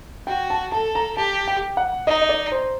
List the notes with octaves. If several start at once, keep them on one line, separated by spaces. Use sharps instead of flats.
F#4 G5
A5
A4 A5
A#5
G4 A5
G5
F#5
D#4 D#5
D#5
D5
C5